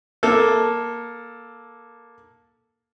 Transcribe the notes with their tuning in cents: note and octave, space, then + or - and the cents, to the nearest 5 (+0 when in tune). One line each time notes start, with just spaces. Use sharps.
A#3 +10 A4 +0